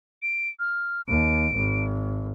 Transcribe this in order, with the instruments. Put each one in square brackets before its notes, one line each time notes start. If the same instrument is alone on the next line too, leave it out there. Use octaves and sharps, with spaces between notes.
[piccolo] D7
F6
[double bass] D#2 [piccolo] D7
[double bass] G#1